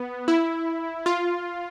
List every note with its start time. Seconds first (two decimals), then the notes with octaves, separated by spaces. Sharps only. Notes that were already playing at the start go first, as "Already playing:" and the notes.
Already playing: B3
0.28 E4
1.06 F4